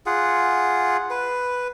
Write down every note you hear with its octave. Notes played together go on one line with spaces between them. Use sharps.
F4 G#4 F#5
B4